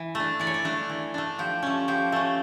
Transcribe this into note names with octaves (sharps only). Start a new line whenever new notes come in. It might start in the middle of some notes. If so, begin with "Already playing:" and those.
Already playing: E3
A3 D4
E3 D5
C#5
D5
A3 D4
E3
A3 D4
F3 G4
A3 C#4
F3 G4
A3 C#4